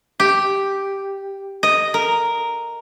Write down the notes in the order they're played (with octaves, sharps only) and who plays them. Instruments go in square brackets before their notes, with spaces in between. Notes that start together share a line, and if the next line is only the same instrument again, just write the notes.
[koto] G4
D#5
A#4